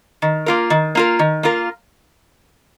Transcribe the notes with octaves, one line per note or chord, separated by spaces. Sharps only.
D#3
A#3 F4 A#4
D#3
A#3 F4 A#4
D#3
A#3 F4 A#4